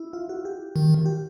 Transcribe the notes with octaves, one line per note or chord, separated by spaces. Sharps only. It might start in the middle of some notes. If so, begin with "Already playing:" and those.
Already playing: E4
F4
F#4
G4
D#3
G4